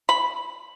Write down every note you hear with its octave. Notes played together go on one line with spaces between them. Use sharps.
B5